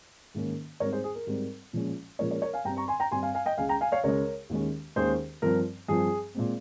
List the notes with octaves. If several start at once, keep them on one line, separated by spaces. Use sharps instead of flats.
G#2 D#3 A#3 C#4
G#2 G3 C4 A#4 C#5
G#4 C5
G#4
A#4
G#2 G3 C4
A#2 F3 G#3 C#4
A#2 F3 G#3 C#4 A#4 C#5
A#4 C#5
A#4 C#5
F5 G#5
G2 G3 C4 G5 A#5
A#5 C#6
G#5 C6
G5 A#5
G2 G3 C4 G#5 C6
F5 G#5
F5 G#5
D#5 G5
C#2 C#3 G#3 F5 G#5
G5 A#5
F5 G#5
C#5 F5
C#2 C#3 G#3 A#4 C#5
D#2 D#3 G#3 C#4
D#2 D#3 G#3 C#4 G#4 C5
G2 F3 C4 A#4
G2 F3 C4 G#4
A#2 G#3 C4